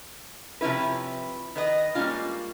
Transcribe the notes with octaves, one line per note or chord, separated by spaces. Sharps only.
C3 F3 C#4 E4 B4
D#3 B4 D#5
G3 G#3 A#3 C#4 F4